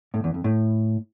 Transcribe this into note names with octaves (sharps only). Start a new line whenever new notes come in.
A2
E2
F2
A2